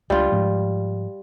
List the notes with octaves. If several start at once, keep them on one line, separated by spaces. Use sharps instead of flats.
C#2 G3 D4 F4
G#2 F3